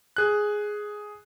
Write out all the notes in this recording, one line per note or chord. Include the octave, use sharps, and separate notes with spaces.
G#4 F#6